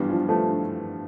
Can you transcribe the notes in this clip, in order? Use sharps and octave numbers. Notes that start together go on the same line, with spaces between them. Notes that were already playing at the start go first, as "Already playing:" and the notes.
Already playing: G2 E3 G3 B3 F4
F3
F3 A3